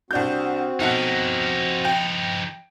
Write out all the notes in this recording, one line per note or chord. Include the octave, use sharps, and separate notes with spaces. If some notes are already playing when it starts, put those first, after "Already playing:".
C2 C4 D4 F#4 G6
B1 F3 D#4 F#5
G5